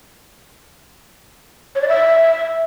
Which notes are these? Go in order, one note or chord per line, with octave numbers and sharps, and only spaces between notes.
C#5
D5
E5